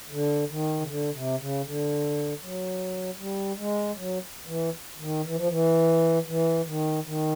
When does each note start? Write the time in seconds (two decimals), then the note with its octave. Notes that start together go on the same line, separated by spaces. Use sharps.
0.10 D3
0.49 D#3
0.80 C#3
0.87 D3
1.13 C3
1.39 C#3
1.64 D3
2.41 F#3
3.18 G3
3.57 G#3
3.96 F#3
4.46 E3
4.98 D#3
5.24 E3
5.36 F3
5.48 E3
6.27 E3
6.65 D#3
7.04 D#3